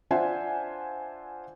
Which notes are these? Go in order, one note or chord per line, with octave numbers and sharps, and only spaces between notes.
D4 F4 C5 E5 F#5 G#5